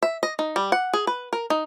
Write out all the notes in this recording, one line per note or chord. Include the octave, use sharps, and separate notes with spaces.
E5
D#5
D#4
G3
F#5
G#4
B4
A#4
D#4